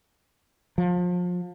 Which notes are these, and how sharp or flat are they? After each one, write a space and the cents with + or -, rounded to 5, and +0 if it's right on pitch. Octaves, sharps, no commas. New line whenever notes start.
F3 +30